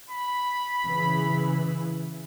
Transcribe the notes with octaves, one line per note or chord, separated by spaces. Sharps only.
B5
C#3 E3